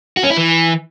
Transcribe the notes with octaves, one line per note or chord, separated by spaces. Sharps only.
F#4
C#4
E4
E3